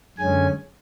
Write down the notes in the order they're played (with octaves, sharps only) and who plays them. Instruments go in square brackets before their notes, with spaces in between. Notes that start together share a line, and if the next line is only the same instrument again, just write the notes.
[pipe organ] F#2 D3 G#3 C#4 G#5